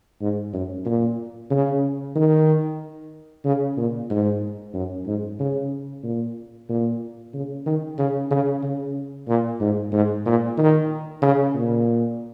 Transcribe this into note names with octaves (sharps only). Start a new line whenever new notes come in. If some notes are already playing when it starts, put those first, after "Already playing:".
G#2
F#2
A#2
C#3
D#3
C#3
A#2
G#2
F#2
G#2
C#3
A#2
A#2
C#3
D#3
C#3
C#3
C#3
A#2
G#2
G#2
A#2
D#3
C#3
A#2